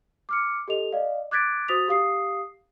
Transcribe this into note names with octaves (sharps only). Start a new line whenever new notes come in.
D6 F6 C#7
G4 A4 D#5 F7
D5 D#5 F5
D6 F#6 G#6 A6 B6 D7
F#4 C5 D#6 A6 B6 F7
G4 F5 D#6 C7